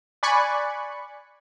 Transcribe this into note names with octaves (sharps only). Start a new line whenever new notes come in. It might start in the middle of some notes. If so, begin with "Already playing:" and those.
D5 G#5 B5 C#6 F#6 C#7